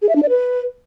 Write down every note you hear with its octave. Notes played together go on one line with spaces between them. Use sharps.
G#4
E5
D4
D5
B4